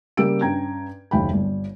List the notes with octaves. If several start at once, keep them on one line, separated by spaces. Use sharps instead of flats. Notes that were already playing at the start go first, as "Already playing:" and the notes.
C#3 G3 A#3 G4 E6 D7
G2 C#4 G5 A#5 G#6
F#1 D#2 G5 B5
G1 G3